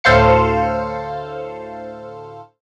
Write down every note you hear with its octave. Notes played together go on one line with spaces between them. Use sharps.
D2 A2 A4 C5 F5 C#7